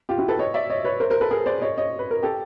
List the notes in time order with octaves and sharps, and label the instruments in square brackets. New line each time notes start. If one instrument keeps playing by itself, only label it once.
[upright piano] F4 G4
E4 F#4
A4 B4
C#5 D#5
D5 E5
C#5 D#5
B4 C#5
A#4 C5
A#4 C5
A4 B4
G#4 A#4
C5 D5
C#5 D#5
C#5 D#5
B4
A#4
G4 A4